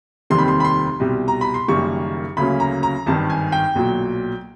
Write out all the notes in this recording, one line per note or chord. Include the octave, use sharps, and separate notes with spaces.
F1 D#2 D#3 G3 C4 C6
B5
C6
B5
C6
C2 B2 G3
A#5
B5
C6
F#1 F#2 D#3 G3 A#3 C#6
D2 C#3 F#3 A#3 C#4 B5
A#5
A#5
G#1 G2 D#3 A5
G#5
G5
B1 A#2 F#3